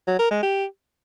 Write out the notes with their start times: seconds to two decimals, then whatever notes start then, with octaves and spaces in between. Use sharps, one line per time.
0.08 F#3
0.19 A#4
0.31 G#3
0.43 G4